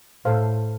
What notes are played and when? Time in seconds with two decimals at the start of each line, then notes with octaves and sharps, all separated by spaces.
0.25 A2 A4 C5 F5